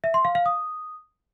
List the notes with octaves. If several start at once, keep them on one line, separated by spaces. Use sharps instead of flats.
E5
C6
F5
F5
D#6